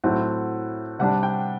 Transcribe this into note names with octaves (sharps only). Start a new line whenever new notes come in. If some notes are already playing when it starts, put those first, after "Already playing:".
A2 F#3 C4 E4 F#5
C3 G3 D4 F#5
G5